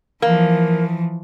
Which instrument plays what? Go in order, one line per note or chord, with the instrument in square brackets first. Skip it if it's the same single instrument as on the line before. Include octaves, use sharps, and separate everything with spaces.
[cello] E3 F3 [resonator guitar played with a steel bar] A#3